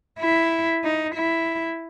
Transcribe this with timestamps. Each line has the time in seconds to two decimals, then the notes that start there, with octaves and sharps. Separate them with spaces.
0.20 E4
0.84 D#4
1.16 E4